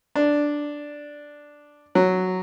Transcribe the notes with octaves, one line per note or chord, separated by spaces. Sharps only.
D4
F#3